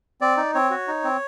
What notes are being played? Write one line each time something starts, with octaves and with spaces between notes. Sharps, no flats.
C4 D5
D#4
C4 C#5
F#4
D#4
C4